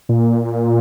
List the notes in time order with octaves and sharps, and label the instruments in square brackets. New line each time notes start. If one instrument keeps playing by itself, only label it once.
[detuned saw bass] A#2